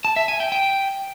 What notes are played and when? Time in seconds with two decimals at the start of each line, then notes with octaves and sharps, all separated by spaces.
0.05 A5
0.16 E5
0.28 G#5
0.40 G5
0.52 G5